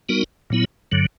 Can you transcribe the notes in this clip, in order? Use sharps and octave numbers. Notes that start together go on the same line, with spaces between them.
G3 B3 D#4 F#4 A#4
A#2 F#3 B3 E4
G2 D3 F#3